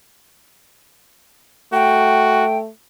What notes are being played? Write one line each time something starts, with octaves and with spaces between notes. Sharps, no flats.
A3 F#4 G5